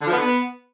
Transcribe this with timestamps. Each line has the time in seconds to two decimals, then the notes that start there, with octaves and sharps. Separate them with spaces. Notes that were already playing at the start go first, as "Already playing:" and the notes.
0.02 D3
0.07 F3
0.12 B3
0.17 D3
0.22 B3